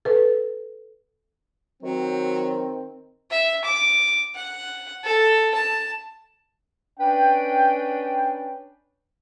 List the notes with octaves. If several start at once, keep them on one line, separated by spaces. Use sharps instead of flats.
A4 B4
D#3 F#3 C4
E5
D6
F#5
A4
A5
C#4 D4 B4 G5